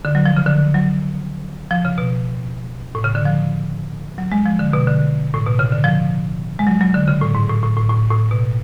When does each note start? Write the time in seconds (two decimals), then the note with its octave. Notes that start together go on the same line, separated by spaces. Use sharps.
0.05 D3
0.15 F#3
0.26 F3
0.36 C#3
0.46 D3
0.74 F#3
1.71 F3
1.85 C#3
1.98 B2
2.95 A2
3.04 C#3
3.15 D3
3.25 F3
4.18 F#3
4.32 G#3
4.46 F3
4.59 D3
4.73 B2
4.87 D3
5.34 A2
5.46 B2
5.59 C#3
5.72 D3
5.84 F3
6.59 G#3
6.67 F#3
6.81 F#3
6.94 D3
7.08 C#3
7.21 A2
7.35 G#2
7.50 A2
7.63 A2
7.77 A2
7.90 A2
8.11 A2
8.31 B2